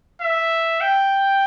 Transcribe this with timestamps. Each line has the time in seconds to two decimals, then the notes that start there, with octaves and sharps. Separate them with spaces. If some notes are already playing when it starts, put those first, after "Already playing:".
0.21 E5
0.81 G5